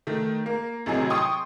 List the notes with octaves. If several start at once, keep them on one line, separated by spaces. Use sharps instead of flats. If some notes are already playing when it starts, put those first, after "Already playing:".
D#3 A3
A#3
G#1 A2 C3 F#3 G#4 D#5
G5 C6 C#6 D#6